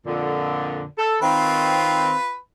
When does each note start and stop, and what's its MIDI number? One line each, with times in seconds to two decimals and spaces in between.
0.06 0.83 41
0.06 0.83 46
0.06 0.83 50
0.98 1.16 69
1.21 2.13 51
1.21 2.13 60
1.21 2.36 65
1.21 2.36 71